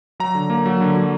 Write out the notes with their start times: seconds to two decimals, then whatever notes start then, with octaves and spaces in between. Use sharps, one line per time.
0.20 F#3 A#5
0.35 D3
0.50 A#3
0.66 F#3
0.81 D3
0.96 F#3